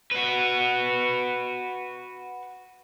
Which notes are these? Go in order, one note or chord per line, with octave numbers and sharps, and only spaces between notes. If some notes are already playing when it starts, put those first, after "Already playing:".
F#4 B4